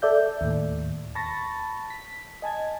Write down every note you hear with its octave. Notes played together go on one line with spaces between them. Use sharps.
A4 D5 E5 G6
D#2 A2
A5 B5 C#6 A6 A#6
B6
D#5 G#5 A5 G#6